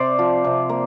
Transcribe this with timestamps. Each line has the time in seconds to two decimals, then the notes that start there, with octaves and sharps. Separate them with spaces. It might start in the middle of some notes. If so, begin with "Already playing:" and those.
Already playing: C3 C5 D5
0.19 F3
0.44 C3
0.69 A#3